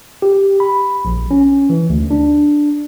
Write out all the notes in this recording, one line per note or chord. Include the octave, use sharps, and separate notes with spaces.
G4
B5
A#1
C#4
E3
D2
D4